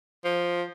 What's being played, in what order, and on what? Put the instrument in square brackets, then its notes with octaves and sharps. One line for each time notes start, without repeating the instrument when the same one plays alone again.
[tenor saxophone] F3